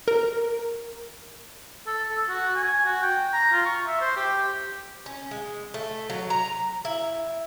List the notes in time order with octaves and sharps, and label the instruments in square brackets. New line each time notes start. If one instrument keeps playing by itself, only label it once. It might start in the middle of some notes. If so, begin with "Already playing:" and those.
[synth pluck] A#4
[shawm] A4
A4
F#4
G#5
F#4
G5
A#5
F4
C#6
E5
C5
G4
[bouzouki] C#4
G#3
A3
F#3
A#5
E4